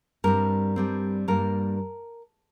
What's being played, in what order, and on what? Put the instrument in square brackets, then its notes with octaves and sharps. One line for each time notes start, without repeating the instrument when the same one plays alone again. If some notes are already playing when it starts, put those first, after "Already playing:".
[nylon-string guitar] G2 G3 C4 A#4
G2 G3 C4
G2 G3 A#3 A#4